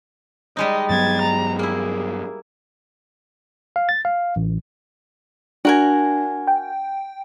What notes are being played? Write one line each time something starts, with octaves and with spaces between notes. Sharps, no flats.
G3 G#3 D#4 D#5
G2 F#3 B3 G#6 A6
A#5
A#3 E4 G#4
F5
A6
F5
A1
D4 F#4 A#4 G#5
G5